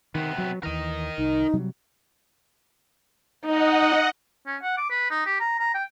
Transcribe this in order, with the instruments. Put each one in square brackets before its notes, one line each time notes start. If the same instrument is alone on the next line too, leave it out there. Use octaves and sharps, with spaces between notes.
[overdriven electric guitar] C3 B3 [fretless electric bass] D#3
[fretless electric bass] F#3
[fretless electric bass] D#2 E3 [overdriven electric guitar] A#4 D#5
[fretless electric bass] C2 [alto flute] D#4
[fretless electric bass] C3 F#3 G3
[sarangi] D#4 [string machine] D#5 F#5
[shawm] C#4
F#5
D6
B4
D#4
G4
A#5
A#5
G5